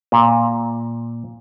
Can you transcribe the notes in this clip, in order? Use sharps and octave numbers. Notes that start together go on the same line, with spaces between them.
A#2